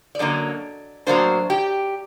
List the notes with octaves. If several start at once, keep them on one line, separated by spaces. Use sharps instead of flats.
D5
F#2 D3 F#3 A#3 D#5
A2 F#3 A#3 D4 C5
G4